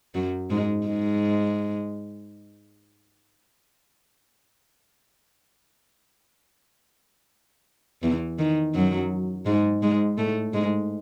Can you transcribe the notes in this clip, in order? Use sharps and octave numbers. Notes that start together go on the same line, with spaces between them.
F#2 F#3
G#2 G#3
G#2 G#3
E2 E3
D#3
F#2 F#3
G#2 G#3
G#2 G#3
A2 A3
G#2 G#3